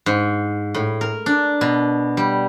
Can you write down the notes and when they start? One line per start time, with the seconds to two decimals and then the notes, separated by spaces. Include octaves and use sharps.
0.06 G#2
0.74 A2
1.01 A#4
1.26 D4
1.61 B2
2.17 G3